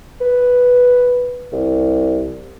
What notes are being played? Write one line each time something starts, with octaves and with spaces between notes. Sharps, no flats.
B4
C2